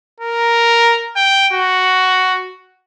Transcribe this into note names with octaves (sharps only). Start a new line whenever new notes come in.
A#4
G5
F#4